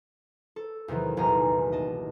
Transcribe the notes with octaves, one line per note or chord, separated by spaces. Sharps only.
A4
E2 C3 D#3 E3 F#3
D#1 B1 E2 G#5 A#5
D#5 A5